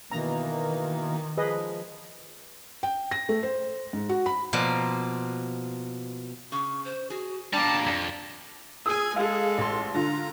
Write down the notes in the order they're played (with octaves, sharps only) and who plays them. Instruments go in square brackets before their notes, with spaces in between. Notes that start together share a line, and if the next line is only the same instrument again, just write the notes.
[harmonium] B2 E3 A#3 [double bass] D#3 [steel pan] A#5
[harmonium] F3 G#3 [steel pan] G#4 B4 D#5
[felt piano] G5
A#6
A3
C5
G#2
F#4
B5
[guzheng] B2 F3 A#3 D5
[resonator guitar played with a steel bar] C#3 [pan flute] C#6
[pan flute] C5
[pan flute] F#4 [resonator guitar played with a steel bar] G#4
[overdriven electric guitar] G3 A#3 [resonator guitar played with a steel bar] D4 [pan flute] G5 [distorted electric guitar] A5
[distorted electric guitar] F2 [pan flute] D5
[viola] G#4 G#5 [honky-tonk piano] D#6 E6
[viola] G#3 A4 [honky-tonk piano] G#4 F5
[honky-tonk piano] A1 C6
[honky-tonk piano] D3 F4 [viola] A#5